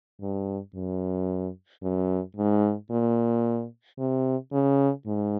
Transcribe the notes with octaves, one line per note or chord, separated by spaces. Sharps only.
G2
F#2
F#2
G#2
A#2
C3
C#3
G#2